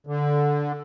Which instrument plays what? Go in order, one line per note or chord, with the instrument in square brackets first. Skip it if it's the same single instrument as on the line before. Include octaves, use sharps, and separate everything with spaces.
[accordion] D3